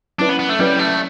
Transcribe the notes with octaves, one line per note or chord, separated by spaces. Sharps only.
F#3 C#4 D4 E4 B4
B3
B3
A3
F#3 G3 C#4 E4 B4
A3